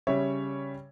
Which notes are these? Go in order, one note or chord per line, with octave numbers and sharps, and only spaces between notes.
C#3 G3 C#4 C#5 E5